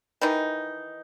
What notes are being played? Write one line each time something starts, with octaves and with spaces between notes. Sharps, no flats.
D#3 E3 D#4